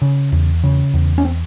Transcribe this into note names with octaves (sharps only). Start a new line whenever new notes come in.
C#3
E2
C#3
E2
C#4
C4